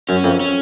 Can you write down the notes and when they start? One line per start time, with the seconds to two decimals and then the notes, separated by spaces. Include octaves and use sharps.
0.09 F#2 C#4
0.24 F2
0.40 C#4